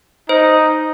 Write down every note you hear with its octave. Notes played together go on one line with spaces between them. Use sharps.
D#4 C5